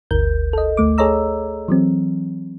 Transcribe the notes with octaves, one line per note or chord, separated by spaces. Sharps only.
G1 D2 A#4 G6
A4 D#5
D2 A3 D6
G#4 A4 C#5 D#5 A#5 E6
E3 F#3 C4